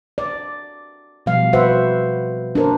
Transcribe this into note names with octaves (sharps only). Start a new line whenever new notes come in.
D5
B2 F3 G3 F5
F#4 B4 C5 E5 F#5
D4 A#4 C5